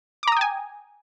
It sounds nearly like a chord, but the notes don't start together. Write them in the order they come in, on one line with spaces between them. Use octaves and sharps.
D6 A#5 D#6 G5 G#5